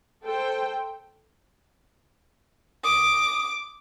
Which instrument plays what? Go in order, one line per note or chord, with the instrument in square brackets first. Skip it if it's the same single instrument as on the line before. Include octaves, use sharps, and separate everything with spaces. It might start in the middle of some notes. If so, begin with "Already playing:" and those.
[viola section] A4 C5 G5
[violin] D6 [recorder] D#6